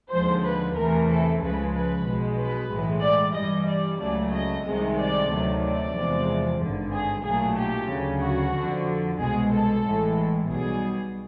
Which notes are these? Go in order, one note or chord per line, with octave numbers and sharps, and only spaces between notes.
D#2 D3 F3 G#3 C5
B4
E2 C3 E3 A3 A#4
A4
C#2 C#3 F3 G#3 B4
B4
B1 B2 G#3
B4
B1 A2 E3 G#3
D5
G2 E3 G3 D#5
D5
C#2 C#3 F#3 A3 D5
D#5
C2 C3 D#3 G#3
D5
D2 C3 D#3 F#3 A3
D5
E2 C3 F3 G#3
G#1 G2 D3
G#4
B1 A#2 F#3 A3 G#4
G4
D2 C#3 F#3
F#4
F2 D3 F3
C2 B2 G#3 G#4
A4
A1 A2 E3 G#3
B1 B2 G3 G#4